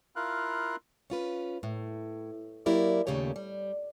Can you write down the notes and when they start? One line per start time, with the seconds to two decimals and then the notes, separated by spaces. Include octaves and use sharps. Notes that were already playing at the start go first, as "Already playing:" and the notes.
0.16 E4 F4 A#4 F5 F#6
1.10 C#4 F4 B4
1.63 A2
2.66 F#3 A#3 E4 G4 A#4 D5
3.07 D#2 A#2 C#3 A3 G4 C#5
3.36 G3